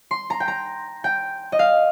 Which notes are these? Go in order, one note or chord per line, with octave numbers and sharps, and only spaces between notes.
C6
A#5
G5
A#5
G5
D#5
F5